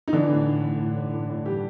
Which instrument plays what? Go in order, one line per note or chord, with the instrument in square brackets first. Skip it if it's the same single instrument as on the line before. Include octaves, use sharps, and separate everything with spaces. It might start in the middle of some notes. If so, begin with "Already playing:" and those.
[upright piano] D#4
D3 E3 D4
A2
A2
A2
A2
A2
A2
A2
E3 G3 G4